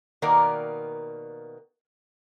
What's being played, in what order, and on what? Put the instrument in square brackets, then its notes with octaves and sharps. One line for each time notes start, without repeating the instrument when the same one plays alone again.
[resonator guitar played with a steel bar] B2 D#3 A#3 B3 A#4 D5